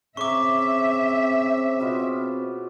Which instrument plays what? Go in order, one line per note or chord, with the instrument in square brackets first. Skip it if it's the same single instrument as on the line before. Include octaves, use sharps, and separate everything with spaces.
[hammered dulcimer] C#3 A#5 [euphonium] C4 [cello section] E5 [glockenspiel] C#6 D6
[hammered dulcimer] B2 B3 F4